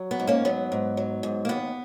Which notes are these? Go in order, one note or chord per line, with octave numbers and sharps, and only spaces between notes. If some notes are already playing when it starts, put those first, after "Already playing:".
Already playing: F#3
B3
G#2
A#3 C#4
F#3 B3
G#2
F#3
G#2
A#3
D#2 B3